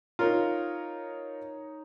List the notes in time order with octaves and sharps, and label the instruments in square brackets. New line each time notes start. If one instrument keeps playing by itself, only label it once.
[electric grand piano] D#4 C#5 A#5 [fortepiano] F4 A#4